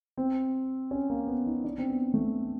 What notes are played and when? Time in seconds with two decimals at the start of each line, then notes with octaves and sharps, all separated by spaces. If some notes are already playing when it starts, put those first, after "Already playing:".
0.17 C4
0.91 C#4
1.10 A#3
1.27 B3
1.46 D#4
1.64 D4
1.78 C4
1.88 B3
2.14 A3